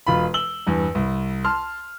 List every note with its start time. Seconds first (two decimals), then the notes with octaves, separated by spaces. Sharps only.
0.07 E1 F4 B5
0.34 E6 F#7 G7
0.67 E2 G2
0.95 C2
1.45 A5 C6 F6